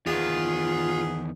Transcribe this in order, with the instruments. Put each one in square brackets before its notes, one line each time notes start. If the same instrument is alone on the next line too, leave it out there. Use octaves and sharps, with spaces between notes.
[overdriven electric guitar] E2 D#3 [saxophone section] B3 G#4 [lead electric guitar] F4